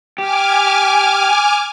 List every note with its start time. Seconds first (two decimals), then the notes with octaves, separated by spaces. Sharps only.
0.18 G4 G#5 D6 F6